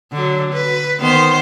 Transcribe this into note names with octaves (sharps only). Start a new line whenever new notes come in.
D3 F#3
B4
D#3 B3 C5